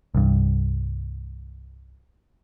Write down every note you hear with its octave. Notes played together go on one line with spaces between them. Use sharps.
C2 G2